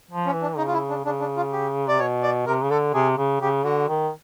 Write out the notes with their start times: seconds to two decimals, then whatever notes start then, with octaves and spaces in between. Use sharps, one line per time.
0.11 F3
0.26 C#4
0.33 E3
0.42 D4
0.58 C#3 D#4
0.68 F4
0.73 E4
0.89 D4
1.04 C#3 D4
1.20 D4
1.37 F4
1.52 G4
1.88 C3 D5
1.99 B2 C#5
2.23 D5
2.46 C3 A#4
2.63 C#3
2.70 D3 A4
2.94 C3 G#4
3.17 C#3
3.41 C#3 G4
3.64 D3 F#4
3.88 D#3